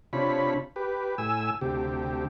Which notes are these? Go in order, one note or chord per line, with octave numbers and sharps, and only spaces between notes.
C3 D4 F4 C#5 B5
G4 B4
A2 G#5 E6
D2 C3 G4